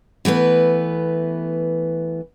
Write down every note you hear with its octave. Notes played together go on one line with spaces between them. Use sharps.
E3 A3 B3 B4